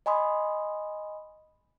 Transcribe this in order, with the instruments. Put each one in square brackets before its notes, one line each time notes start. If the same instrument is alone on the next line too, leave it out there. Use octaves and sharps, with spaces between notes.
[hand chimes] D#5 G#5 B5 C6 D#6